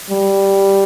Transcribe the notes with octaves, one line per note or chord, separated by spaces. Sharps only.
G3